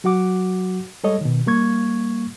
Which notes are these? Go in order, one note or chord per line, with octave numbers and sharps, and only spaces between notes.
F#3 F#4 F#5 D6
G3 G#3 A4 C#5 D#5
B2 D#3
G3 A#3 C#6 G#6